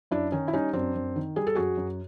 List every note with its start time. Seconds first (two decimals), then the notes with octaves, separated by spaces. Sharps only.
0.11 F#2 D4 E4
0.32 D#3 C#4 D#4
0.48 E4
0.53 G3 C#4 D#4
0.73 F#2 C4 D4
0.95 F#2
1.16 D#3
1.36 G3 G#4
1.47 A4
1.55 F#2 F#4 G#4
1.77 F#2